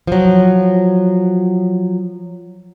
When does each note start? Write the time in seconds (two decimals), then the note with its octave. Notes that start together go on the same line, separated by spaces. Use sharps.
0.07 F3 F#3